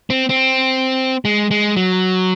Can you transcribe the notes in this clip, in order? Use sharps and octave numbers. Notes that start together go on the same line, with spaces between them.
C4
C4
G#3
G#3
F#3